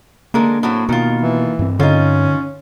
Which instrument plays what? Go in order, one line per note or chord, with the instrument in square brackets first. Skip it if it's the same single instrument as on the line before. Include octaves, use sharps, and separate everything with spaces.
[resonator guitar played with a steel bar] D3 G#3 A#4 [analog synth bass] A#3
[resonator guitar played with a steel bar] A2 F#3 C4
[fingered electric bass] B2 [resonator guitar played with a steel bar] D#3 F4
[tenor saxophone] E3
[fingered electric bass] G2 C4
[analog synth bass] D3 [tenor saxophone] C#4 [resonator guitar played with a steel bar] D#4 F4